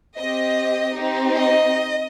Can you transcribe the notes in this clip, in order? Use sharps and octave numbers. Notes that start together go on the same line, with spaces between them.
C4 G4 D#5
C4 D#4 G4
D#5